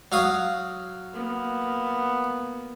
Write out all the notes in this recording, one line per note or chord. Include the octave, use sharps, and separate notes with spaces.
F#3 F5 D#6
A#3 B3